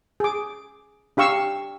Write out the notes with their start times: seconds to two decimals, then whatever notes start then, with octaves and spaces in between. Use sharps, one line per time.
0.20 G#4 D6
1.17 D4 G4 F5 C#6 E6